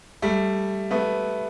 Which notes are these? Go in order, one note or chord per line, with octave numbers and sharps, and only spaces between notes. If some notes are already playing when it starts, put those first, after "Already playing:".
G3 A3
A3 B3